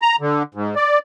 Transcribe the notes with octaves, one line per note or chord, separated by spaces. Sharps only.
A#5
D3
G#2
D5